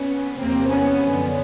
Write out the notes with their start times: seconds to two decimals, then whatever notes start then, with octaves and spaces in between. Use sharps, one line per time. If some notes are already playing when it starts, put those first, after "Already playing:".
Already playing: B3 C#4
0.36 E2 C3 F3 A#3 C4
0.69 B3 C#4
1.02 F#2 D3 F3